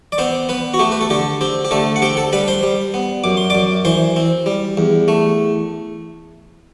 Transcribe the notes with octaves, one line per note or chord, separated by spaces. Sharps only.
D5
B3 C4 C5
B3 B4
F#4
A3 G4
B4
A4
D3 G4
C4 G4
G4
D3 A3 A4
F#5
C4 G4 G5
A4 A5
G3 B4 B5
C5 C6
G3
B3
F#2 D6
C6
F#2 D5 D6
E3 C5 C6
C4
G3
E2
A3